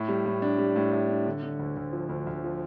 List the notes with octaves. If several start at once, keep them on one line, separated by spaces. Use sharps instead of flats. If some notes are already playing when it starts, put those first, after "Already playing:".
Already playing: A2
G3
A2
D4
G3
A2
A2
D4
D3
D3
D2
D2
F3
D2
D2
F3